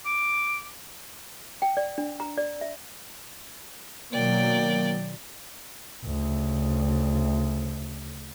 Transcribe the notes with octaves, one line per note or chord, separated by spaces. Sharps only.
D6
G5
D5
D4
A#5
D5
E5
B2 D#3 F#3 A#3 D5 G5
D2 C#3